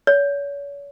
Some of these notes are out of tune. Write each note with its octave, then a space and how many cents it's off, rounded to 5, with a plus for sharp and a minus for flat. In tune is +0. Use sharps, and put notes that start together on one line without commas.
C#5 +40